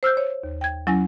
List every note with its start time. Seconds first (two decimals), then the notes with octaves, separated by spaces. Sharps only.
0.03 C5 E6 F6 G6
0.17 C#5
0.44 D#2
0.61 G5 G#6
0.87 F#3 C#4 E4 G#5 A#6